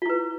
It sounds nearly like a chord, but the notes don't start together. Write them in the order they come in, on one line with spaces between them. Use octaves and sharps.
F4 E4 B4